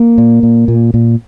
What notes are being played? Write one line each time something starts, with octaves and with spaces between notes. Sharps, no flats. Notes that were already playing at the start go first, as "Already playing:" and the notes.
Already playing: A#3
A#2
A#2
A#2
A#2